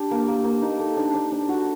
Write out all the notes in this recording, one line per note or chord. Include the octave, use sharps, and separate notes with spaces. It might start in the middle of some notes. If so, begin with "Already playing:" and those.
Already playing: D4 G4
A#3
A#3
A#3
D#4
A4
D4
D4
D4
F#4